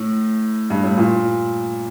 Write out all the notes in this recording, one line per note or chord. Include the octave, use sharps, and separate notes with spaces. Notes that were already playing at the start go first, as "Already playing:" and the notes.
Already playing: A2
G2
A2
A#2